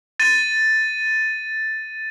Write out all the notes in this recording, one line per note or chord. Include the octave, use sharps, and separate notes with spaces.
A6 D#7